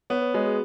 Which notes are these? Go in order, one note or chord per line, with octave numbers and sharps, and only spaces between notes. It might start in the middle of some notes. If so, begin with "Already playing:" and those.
B3 C#5
B4
G#3 F#4
G#4